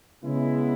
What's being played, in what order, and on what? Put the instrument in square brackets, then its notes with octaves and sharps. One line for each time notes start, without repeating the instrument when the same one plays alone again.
[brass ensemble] C#3 G#3 B3 E4